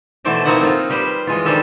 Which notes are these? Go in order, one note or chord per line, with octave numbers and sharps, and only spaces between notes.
B2 E3 A3 C5 D5 A5
A#3 C4 D#4 E4 A4 F#5
A#3 F4
G3 G4 B4 C5
E3 G#3 F4
D#3 G3 C4 D4 G4 A4